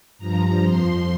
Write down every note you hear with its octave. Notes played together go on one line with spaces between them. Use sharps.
G2 F3 A#5
F2 F3 C6